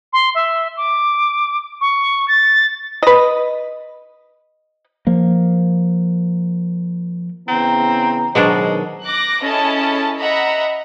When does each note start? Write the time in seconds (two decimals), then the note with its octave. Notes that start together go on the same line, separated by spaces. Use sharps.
0.13 C6
0.35 E5
0.77 D6
1.81 C#6
2.28 A6
3.03 B4 D#5
5.07 F3 A#3
7.48 C#3 E3 B3 C4 A#5
8.35 B2 D#3 F#3 G#3 D4 C5
9.06 D6 F#6 A#6
9.42 C#4 E4 G#4 A4 D#5 A5
10.17 D#5 E5 F#5 A#5 B5